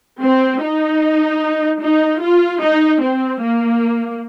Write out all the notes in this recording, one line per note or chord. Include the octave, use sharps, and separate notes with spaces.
C4
D#4
D#4
F4
D#4
C4
A#3